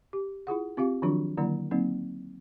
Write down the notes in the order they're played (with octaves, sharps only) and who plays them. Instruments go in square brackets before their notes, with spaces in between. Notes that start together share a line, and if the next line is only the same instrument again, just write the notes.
[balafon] G4
E4 F4 G#4 F#5
C4 F4 G4 F5
D#3 F3 F#3 D4 F4 F#4
D3 D#3 F#3 A#3 E4 D5
F#3 A#3 C4 D#4